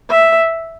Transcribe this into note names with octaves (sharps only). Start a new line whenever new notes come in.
E5